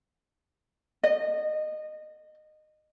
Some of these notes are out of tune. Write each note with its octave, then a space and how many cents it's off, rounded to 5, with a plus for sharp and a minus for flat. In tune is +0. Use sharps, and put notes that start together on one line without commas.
D#5 -20